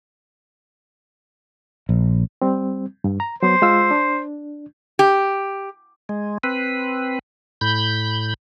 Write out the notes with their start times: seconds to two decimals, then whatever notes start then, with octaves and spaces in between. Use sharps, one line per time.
1.89 A#1
2.42 G3 C4
3.04 G2
3.20 A#5
3.43 F#3 B3 C5
3.62 G#3 F4 E6
3.91 D4
4.99 G4
6.09 G#3
6.44 C4 B4
7.61 A2 B5 G6